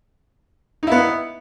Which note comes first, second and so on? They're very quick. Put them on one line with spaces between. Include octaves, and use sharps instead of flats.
D#4 E4 B3